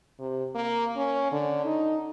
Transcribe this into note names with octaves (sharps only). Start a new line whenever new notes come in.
C3
A#3
C#4
D3
D#4